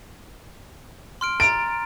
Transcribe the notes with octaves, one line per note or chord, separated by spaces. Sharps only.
C6 F6 D7
A#5 A6 D7